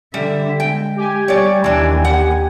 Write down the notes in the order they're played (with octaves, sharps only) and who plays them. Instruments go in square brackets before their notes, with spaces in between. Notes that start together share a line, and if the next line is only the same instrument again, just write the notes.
[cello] D3 E5 [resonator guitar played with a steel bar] G3
[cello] G#3 [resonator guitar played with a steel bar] G5
[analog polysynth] G4 G#5
[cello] G3 [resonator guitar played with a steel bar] C#5 D5
[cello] D#2 [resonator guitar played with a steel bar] E3 D4
[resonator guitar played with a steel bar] F#5